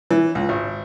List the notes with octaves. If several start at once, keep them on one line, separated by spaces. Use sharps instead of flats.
E3
C#2
G#1